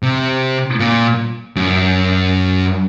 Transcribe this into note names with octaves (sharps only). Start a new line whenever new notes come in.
C3
A#2
F#2